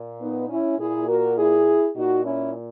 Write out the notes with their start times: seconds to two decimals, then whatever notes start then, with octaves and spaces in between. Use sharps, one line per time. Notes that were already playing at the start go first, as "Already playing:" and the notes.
Already playing: A#2
0.21 B3 D#4
0.49 C#4 E4
0.79 A#2 E4 G#4
1.08 F#4 A#4
1.37 E4 G#4
1.95 A#2 D#4 F#4
2.24 C#4 E4